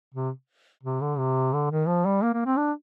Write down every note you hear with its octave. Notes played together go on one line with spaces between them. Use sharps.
C3
C3
D3
C3
D3
D#3
F3
G3
A#3
A#3
C4
D4